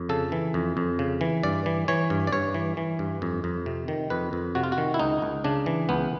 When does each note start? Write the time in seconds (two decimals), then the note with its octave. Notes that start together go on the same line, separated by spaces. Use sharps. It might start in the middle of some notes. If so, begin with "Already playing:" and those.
Already playing: F2
0.09 C#3 A4
0.32 E3
0.54 F2
0.77 F2
0.99 C#3
1.21 E3
1.43 G2 D5
1.66 E3
1.88 E3 C#5
2.10 G2
2.27 D5
2.32 G2 C#5
2.54 E3
2.77 E3
2.99 G2
3.22 F2
3.44 F2
3.66 C3
3.88 D#3
4.10 F2 B4
4.33 F2
4.55 C3 F#4
4.63 F4
4.72 F#4
4.78 D#3
4.94 E4
4.99 C#2 D#4
5.22 C#2
5.44 C#3 D4
5.66 E3
5.89 C#2 B3